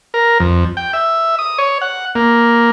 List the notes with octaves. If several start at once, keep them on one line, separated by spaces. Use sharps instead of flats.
A#4
F2
G5
E5
D#6
C#5
F#5
A#3